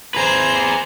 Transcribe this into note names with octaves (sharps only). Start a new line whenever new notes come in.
G#4 B4 C5 A#5